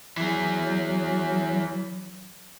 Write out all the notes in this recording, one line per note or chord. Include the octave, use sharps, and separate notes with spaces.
E3 F#3 G#4